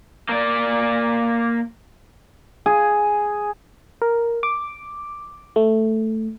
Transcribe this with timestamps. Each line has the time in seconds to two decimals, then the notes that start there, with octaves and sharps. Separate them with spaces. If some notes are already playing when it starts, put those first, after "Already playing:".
0.29 A#3 D5
2.66 G#4
4.02 A#4
4.43 D6
5.56 A3